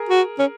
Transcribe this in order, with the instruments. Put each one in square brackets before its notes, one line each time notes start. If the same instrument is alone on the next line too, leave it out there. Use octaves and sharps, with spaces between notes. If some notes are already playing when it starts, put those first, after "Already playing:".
Already playing: [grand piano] G#4 A#4
[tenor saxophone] F#4
C#4